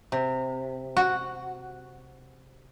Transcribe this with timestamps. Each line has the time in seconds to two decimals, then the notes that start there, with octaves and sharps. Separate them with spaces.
0.12 C3
0.97 F#4